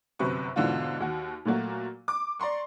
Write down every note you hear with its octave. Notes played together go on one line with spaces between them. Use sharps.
G1 F#2 C3 B4 C#6
G#2 B2 D3 E3 D4 F4
D#2 F#4
A#2 F#3 A3 A#3 F#4
D6
D5 A#5 C6 C#6